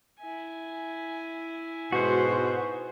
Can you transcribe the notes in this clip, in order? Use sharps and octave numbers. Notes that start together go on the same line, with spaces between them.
E4 G#5
G#2 B2 F#4 C5